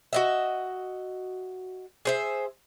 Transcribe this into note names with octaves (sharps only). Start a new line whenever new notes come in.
F#4 D#5 E5
G#4 C5 E5